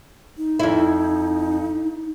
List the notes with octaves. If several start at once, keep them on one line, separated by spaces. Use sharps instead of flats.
D#4
F2 E4